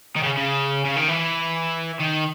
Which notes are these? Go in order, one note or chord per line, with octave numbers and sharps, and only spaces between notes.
D#3
C#3
C#3
C#3
D#3
E3
D#3